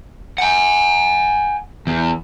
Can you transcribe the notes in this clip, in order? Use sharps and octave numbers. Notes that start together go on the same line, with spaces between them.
F#5 G#5
E2